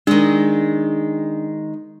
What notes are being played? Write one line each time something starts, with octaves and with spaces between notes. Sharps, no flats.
D#3 G#3 D4